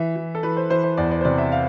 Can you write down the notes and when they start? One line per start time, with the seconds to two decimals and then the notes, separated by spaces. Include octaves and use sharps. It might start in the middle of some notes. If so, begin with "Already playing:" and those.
Already playing: E3 E5
0.16 E3
0.35 A4
0.43 E3 B4
0.57 C5
0.70 E3 C5
0.84 C5
0.97 E2 D5
1.11 D5
1.21 C5
1.25 C3 D5
1.38 E5
1.52 F5